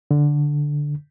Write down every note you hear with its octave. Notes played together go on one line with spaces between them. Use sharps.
D3